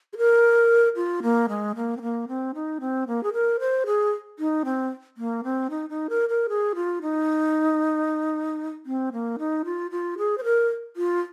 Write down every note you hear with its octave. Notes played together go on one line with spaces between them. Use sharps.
G#4
A#4
F4
A#3
G#3
A#3
C4
A#3
C4
D#4
C4
A#3
G#4
A#4
C5
G#4
D#4
C4
A#3
C4
D#4
D#4
A#4
A#4
G#4
F4
D#4
C4
A#3
D#4
F4
F4
G#4
C5
A#4
F4